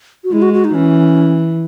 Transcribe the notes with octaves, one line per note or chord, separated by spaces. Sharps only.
F#4
G#3 E4
F#4
F#4
D#4
E3 C#4